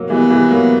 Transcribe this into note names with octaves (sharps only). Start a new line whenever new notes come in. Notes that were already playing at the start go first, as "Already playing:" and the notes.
Already playing: F#3 A#3
E3 G3 B3
E3 G3
F#3 A#3